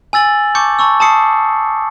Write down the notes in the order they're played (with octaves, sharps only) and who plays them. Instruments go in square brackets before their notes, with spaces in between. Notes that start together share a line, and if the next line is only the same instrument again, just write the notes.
[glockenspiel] G#5 E6 A6 F#7
A5 C#6 D6 G6 C#7
A5 B5 C#6 E6
A5 B5 D#6 C7 C#7